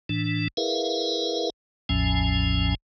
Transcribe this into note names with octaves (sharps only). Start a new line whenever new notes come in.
A2 E3 D4
E4 G#4 A#4 B4 E5 F5
A1 E2 A2 F3 C#4 G#5